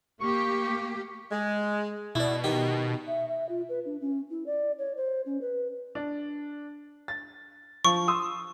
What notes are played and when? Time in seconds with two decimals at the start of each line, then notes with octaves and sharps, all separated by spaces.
0.21 A#3 G4 C#6
1.32 G#3
2.15 B2 E4 D5
2.44 D#3 G4
3.07 E5
3.28 E5
3.49 F4
3.69 B4
3.85 D4
4.01 C#4
4.30 E4
4.46 D5
4.78 C#5
4.97 C5
5.26 C#4
5.41 B4
5.95 D4
7.08 A6
7.85 F3 C#6
8.08 C6 D#6 E6